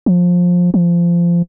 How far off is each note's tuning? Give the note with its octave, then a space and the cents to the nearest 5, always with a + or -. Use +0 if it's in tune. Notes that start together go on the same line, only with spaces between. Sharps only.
F3 +20
F3 -20